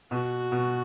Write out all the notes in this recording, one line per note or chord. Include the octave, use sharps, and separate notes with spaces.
B2 F#4
B2